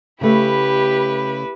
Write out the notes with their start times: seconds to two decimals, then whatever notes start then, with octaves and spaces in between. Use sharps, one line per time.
0.21 C#3 A3 E4 G4 B4